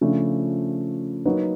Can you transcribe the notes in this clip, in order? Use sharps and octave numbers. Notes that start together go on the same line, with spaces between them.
C#3 F3 A3 D4
F#3 A#3 D#4 F#4 B4